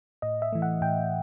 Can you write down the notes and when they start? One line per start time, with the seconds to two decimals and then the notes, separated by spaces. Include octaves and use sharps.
0.22 A2 D#5
0.42 E5
0.53 E3 A3
0.62 F#5
0.82 A2 G5